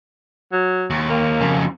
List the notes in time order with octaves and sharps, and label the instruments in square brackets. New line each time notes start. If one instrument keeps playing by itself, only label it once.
[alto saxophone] F#3
[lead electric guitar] D#2
[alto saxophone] A#3
[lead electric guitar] F2 C#3